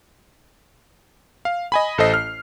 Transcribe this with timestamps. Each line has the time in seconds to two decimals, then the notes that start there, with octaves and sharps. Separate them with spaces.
1.45 F5
1.72 D#5 G#5 B5
1.98 A1 A4 C5 D#5 C7
2.14 F6